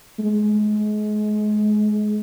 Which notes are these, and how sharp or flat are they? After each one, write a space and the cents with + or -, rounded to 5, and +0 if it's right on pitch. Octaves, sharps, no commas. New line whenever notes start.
G#3 +30